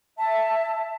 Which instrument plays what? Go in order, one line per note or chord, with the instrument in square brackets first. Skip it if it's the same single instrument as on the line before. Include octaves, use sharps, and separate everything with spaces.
[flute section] E5 A5